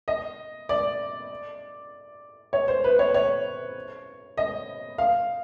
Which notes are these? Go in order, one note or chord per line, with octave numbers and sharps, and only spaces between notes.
D#5
D5
C#5
C5
B4
C#5
C#5
D#5
F5